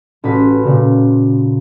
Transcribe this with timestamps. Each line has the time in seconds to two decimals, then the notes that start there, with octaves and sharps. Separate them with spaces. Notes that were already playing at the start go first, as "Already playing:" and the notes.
0.24 A1 F#4 B4
0.64 A#2 C#3